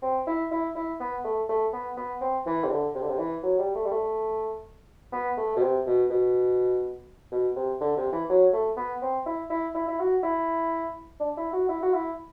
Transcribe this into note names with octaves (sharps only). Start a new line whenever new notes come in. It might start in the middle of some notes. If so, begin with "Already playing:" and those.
C4
E4
E4
E4
B3
A3
A3
B3
B3
C4
E3
C3
D3
C3
D3
C3
E3
F#3
G3
A3
G3
A3
B3
A3
B2
C3
B2
B2
B2
C3
D3
C3
E3
F#3
A3
B3
C4
E4
E4
E4
E4
F#4
E4
D4
E4
F#4
E4
F#4
E4